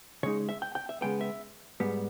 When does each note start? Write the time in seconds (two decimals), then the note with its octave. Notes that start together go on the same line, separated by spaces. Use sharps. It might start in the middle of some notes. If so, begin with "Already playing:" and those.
0.23 C#3 G#3 D#4 C#5
0.49 E5
0.62 G5
0.75 G5
0.89 E5
1.01 C#3 E3 G#3 B3 G5
1.21 E5
1.80 G#2 G3 B3